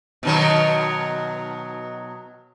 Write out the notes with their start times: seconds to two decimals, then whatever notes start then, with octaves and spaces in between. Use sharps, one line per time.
0.23 B2 D#3 F#3